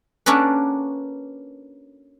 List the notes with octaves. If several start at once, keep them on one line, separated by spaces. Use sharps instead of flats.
A#3 C#4 D4 F#4 A4 B4